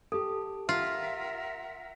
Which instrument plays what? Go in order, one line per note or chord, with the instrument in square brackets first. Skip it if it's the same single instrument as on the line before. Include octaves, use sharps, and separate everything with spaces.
[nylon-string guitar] G4 A5 [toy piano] A4
[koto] F4 [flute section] A#4 E5 F#5